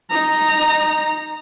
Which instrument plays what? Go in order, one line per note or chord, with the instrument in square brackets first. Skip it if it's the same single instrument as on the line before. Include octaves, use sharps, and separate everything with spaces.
[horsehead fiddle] D#4 A#5